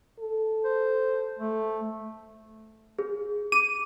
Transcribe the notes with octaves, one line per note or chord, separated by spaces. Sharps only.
A4
C5
A3
G#4
D6 D#7